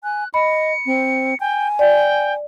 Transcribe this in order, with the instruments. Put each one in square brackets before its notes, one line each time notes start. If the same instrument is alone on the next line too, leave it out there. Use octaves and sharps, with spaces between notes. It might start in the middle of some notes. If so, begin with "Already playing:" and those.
[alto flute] G#5 [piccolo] F#6
[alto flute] D#5 [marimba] B5 [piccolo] C#7
[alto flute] C4
[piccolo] G5 [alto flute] G#5
[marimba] D5 [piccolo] G5